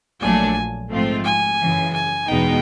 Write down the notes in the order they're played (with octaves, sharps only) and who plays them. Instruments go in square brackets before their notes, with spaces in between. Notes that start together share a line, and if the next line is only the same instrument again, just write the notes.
[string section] A#1 A#2 F#3 A3 D4 [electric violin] G#5
[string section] G#2 F3 A3 C4 F4
[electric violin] G#5
[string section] F#2 C#3 E3
[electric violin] G#5
[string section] E2 B2 G#3 B3 D#4 [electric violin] G5